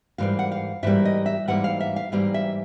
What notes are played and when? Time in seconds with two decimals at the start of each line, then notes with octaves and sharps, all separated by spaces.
0.18 G#2 E3 G3 A#3 F5
0.39 F#5
0.52 F5
0.83 G#2 E3 G3 A#3 E5
1.05 D#5
1.26 E5
1.48 G#2 E3 G3 A#3 F#5
1.64 F5
1.80 E5
1.96 F5
2.12 G#2 E3 G3 A#3 F5
2.34 E5